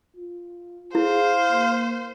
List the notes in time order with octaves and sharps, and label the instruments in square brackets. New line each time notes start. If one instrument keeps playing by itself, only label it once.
[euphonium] F4
[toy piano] E4 [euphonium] G#4 [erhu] C5 [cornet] F5
[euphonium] A#3